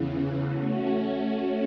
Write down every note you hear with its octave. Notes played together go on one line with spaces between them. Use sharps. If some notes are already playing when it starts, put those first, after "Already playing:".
Already playing: E2 C#3 E3
A3 C#4 F#4